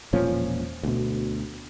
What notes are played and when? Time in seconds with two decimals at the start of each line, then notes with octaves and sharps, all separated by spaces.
0.13 E1 A#2 F3 C#4
0.83 D2 B2